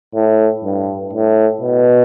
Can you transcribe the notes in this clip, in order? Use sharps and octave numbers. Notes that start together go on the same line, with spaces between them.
A2
G2
A2
B2